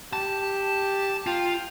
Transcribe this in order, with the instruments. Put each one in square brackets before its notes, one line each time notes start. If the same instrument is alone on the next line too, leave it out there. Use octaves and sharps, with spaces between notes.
[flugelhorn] G4 [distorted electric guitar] A5
[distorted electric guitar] F4 [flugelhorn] G5